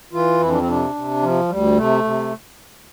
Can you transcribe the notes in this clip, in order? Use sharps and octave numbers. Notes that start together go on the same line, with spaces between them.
E3 F4
F2 E4
D4
C4
C3 D4
C3
F3
D2 G3
C3 A3
C3